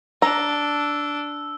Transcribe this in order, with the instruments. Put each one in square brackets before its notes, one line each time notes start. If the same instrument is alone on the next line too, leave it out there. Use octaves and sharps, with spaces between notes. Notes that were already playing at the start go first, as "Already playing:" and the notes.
[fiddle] D4 [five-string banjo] A#5 [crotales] E6